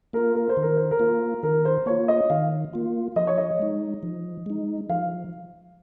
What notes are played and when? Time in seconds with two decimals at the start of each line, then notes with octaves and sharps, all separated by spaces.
0.13 A#3 F4 A#4
0.35 A#4
0.49 C5
0.57 D#3
0.63 A#4
0.77 C5
0.91 A#4
1.00 A#3 F4
1.43 D#3 A#4
1.65 C5
1.86 A#3 F4 C#5
2.08 D#5
2.30 D#3 F5
2.73 A#3 F4
3.16 F3 D#5
3.27 C#5
3.38 D#5
3.59 G#3 D#4
4.03 F3
4.46 G#3 D#4
4.89 F3 F5